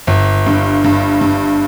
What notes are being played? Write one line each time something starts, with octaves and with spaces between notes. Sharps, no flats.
G1
G2
G2
G2